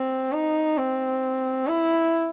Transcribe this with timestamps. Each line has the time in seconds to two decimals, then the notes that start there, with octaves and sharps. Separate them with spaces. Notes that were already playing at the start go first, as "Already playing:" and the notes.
Already playing: C4
0.32 D#4
0.77 C4
1.67 E4